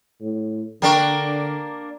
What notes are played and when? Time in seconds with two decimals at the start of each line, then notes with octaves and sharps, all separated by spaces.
0.21 A2
0.82 D3 A#3 D4 A#4 G5 C#6